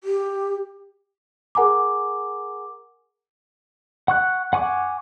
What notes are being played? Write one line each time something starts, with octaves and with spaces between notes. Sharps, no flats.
G4
G#4 A#4 F#5 G#5 A#5 D6
F#5 C#6 F#6
F#5 G#5 C#6 D6